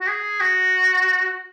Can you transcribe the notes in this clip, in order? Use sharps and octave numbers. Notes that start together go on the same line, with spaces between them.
F#4
G#4
F#4